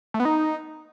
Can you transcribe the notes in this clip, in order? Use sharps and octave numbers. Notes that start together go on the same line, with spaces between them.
A3
B3
D#4